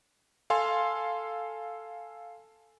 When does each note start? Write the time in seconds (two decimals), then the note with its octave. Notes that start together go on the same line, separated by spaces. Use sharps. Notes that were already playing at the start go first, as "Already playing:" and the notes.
0.50 A4 F5 G#5 C6